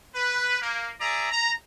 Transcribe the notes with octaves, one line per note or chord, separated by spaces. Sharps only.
B4
A#3
G#4 D5 E5 A#5
A#5